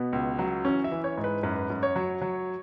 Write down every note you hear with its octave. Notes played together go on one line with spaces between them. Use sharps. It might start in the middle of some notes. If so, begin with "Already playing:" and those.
Already playing: B2 B3
C#2
F#3
E3 C#4
E5
E3
C#5
G#2
B4
F#2 B4
F#2
C#5
F#3
F#3